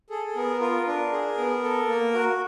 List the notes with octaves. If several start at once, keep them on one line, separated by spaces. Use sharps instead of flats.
G#4 A4
A4
B3 A#4
F4 A#4
D4 A#4
G#4
B3
A4
A#3
F#4